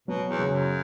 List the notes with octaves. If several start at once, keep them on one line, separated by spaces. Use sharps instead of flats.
B2 F#3 B3
E2
C#3 F#3
F#2